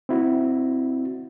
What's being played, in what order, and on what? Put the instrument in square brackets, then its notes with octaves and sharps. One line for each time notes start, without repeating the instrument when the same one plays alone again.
[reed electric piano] C4 E4 F#4